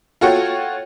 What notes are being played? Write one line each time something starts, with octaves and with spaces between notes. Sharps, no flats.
F4 F#4 A4 C#5 F#5 G5